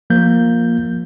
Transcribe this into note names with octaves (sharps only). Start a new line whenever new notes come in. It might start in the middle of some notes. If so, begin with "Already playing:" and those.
F3 A#3 G6